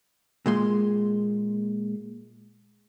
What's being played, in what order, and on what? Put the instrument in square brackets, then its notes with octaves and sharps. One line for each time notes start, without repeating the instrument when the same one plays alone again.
[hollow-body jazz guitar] A#2 G#3 C6